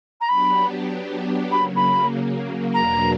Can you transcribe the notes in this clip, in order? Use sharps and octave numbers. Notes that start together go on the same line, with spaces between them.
A#5
F#3 B3 D4 G4 B5
C#3 F#3 A#3 B5
B5
E2 B2 F#3 A#3 D4 A#5